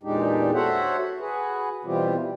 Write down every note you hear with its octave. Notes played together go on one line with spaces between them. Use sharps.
E2 A#2 G#3 D4 D#4 G4
F#4 A4 C5 C#5 E5 F#5
F#4 G#4 B4
B2 E3 G3 C4 F4 G4